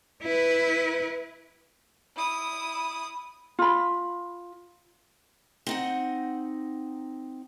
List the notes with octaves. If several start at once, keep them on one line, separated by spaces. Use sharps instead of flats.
E4 B4
E4 D#6
F4 B5
C4 D#4 F#5